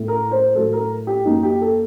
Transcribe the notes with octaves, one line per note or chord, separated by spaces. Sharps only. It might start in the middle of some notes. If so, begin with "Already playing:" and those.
Already playing: A2 A3
A#4
C5
A2 F#3 A3 A4
A#4
G4
F#2 F#3 A#3 D#4
G4
A4